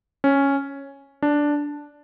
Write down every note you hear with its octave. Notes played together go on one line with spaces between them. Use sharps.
C#4
D4